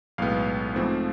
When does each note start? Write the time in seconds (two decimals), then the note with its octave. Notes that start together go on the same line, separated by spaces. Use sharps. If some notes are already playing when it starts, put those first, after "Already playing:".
0.18 B1 A2 G#3 B3 F5
0.75 G#2 F3 A3 C4